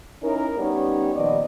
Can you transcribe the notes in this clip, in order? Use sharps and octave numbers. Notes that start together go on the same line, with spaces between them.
C#4 D#4 E4 A#4
G3 B3 C#4 D#4 G4 C#5
A#2 D#3 F3 B3 D5 D#5